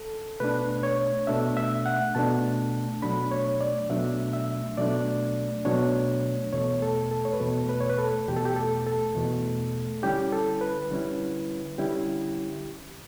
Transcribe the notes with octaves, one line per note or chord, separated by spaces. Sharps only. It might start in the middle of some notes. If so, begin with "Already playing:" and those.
Already playing: A4
B2 A3 D4 B4
C#5
B2 A3 D4 E5
E5
F#5
B2 A3 D4 A5
B2 F#3 A3 D4 B5
C#5
D5
B2 F#3 A3 D4 E5
E5
B2 F#3 A3 D4 D5
B2 F#3 A3 D4 C#5
E2 B2 A3 C#5
A4
A4
C#5
B4
E2 B2 A3 A4
B4
C#5
B4
A4
E2 B2 A3 G4
A4
G4
A4
A4
E2 B2 A3
D3 G3 C#4 E4 G4
A4
B4
D3 G3 C#4 E4
D3 G3 C#4 E4 G4